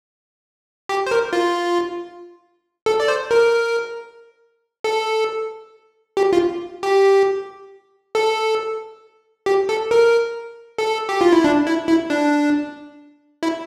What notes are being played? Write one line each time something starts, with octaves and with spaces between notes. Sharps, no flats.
G4
C5
A#4
F4
A4
D5
C5
A#4
A4
G4
F4
G4
A4
G4
A4
A#4
A4
G4
F4
E4
D4
E4
E4
D4
E4